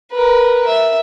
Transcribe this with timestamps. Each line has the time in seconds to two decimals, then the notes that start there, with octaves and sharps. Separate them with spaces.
0.12 A#4 B4
0.67 E5